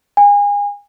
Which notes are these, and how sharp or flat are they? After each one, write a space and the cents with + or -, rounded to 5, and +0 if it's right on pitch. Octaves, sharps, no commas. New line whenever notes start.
G#5 -30